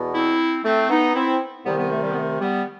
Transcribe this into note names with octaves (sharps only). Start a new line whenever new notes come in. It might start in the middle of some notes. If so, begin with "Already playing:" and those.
Already playing: E2 B2
C4 E4
A3 C4
B3 D#4
C4 E4
C2 C3 D#3 G3 B3
G3 B3
A3
G3
B3
A3
G3 B3